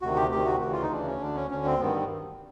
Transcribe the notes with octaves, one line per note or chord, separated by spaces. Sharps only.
D2 C3 D#3 F#4
G4
D2 C3 D#3 G4
F#4
D2 C#3 E3 F#4
F4
D#4
D2 C#3 E3 D4
C#4
D2 D3 D4
C#4
D2 D3 C#4
C4
G2 D#3 B3